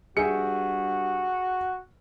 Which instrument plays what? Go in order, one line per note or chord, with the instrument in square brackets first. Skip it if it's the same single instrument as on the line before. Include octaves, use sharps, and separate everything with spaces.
[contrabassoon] G2 [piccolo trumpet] F#4 [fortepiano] G#4 E5 G5 [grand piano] C#7